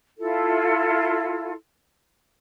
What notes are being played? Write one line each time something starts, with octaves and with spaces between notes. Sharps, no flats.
E4 F4 A4